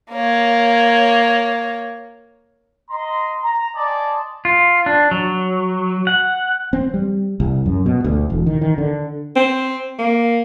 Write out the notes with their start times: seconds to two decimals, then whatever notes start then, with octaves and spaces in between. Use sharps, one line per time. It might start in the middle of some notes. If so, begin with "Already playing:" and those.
0.11 A#3 C#5
2.90 D#5 A#5 C6
3.42 A#5
3.75 D5 D#5 G#5 A5 C6
4.45 F4
4.86 D4
5.11 F#3
6.07 F#5
6.73 C4
6.94 G3
7.40 C2
7.66 F#2
7.86 B2
8.04 D2
8.30 E1
8.46 D#3
8.61 D#3
8.78 D3
9.36 C4
9.99 A#3